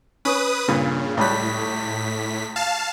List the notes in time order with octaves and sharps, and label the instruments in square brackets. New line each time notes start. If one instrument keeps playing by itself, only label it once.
[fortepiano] C#4 [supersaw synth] B4 D#6
[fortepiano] G2 A#2 [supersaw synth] C#3
[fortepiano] C#2 G3 F#6 [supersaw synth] A2 B6
[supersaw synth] F5 A5